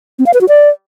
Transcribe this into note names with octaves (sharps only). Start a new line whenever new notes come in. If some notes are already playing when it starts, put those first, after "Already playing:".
C4
F5
B4
F#4
D5